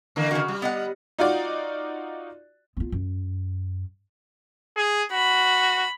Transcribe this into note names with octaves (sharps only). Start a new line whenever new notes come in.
D3 E3 A#3
C#3 F#4
G3
B3 D#5 F#5
D#4 F4 F#4 D5
B3 F4
F#2
G#4
F#4 B5